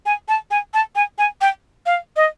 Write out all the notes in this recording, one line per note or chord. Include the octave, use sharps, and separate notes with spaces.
G#5
A5
G#5
A5
G#5
G#5
G5
F5
D#5